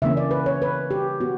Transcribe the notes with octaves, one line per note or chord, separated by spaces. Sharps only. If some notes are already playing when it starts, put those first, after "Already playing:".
C#3 E3 A#3 C#4 E5
D5
B4
C#5
B4
G4
B3 F#4